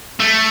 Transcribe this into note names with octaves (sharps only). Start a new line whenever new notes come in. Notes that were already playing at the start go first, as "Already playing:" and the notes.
A3